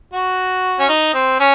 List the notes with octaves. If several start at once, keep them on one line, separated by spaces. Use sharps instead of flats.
F#4
C#4
D#4
C4
C#4